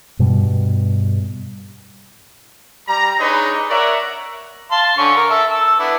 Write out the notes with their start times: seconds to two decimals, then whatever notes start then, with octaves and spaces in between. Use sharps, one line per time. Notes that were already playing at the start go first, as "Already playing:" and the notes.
0.19 G2 B2 G3
2.88 G3 A#5
3.19 D4 D#4 G#4 B4 C#5
3.69 A#4 C#5 D5 E5 F#5
4.71 F5 A5 C6
4.97 D3 C#4 C#6
5.16 A#4
5.30 A4 E5
5.51 A4 E6
5.79 B3 D4 E4